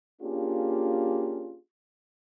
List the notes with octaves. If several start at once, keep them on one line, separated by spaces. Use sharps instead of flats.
A#3 C#4 D4 F4 G4 G#4